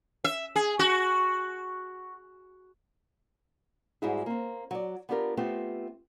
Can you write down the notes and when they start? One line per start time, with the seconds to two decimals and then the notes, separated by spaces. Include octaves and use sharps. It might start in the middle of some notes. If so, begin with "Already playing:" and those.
0.24 E5
0.56 G#4
0.79 F#4
4.02 G#2 G3 G#3 E4 F#4 G#4
4.26 A#3 C4
4.71 F#3 D5
5.09 B3 D4 F4 G4 A4 A#4
5.37 A3 B3 C4 F4 G4